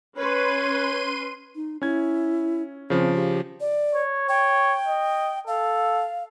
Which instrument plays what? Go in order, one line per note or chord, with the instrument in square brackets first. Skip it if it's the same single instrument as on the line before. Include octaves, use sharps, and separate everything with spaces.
[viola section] C#4 B4 [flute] C#5 [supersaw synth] C6 D#7
[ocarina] D#4
[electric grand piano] C#4 G#6 [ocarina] E4
[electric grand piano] C#3 F3 [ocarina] C4
[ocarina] G4
D5
[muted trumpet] C#5
[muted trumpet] C#5 [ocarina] G5
[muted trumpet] D#5
[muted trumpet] A4 [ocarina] F5